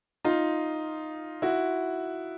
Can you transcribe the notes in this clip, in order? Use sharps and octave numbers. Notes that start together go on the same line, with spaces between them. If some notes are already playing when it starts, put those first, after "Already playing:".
D#4 F4
E4 F#4